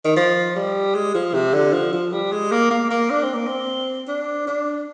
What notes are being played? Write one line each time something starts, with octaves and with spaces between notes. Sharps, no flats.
D#3
F3
G3
G#3
F3
C3
D3
F3
F3
G3
G#3
A#3
A#3
A#3
D4
C4
A#3
C4
D4
D4